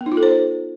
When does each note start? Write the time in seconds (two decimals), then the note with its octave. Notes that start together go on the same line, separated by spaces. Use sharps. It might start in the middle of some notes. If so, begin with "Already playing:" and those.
0.01 B3
0.06 D#4
0.12 F4
0.17 A4
0.23 C5